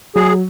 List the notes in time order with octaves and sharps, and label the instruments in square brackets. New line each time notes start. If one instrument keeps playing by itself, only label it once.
[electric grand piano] F#3 [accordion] G#4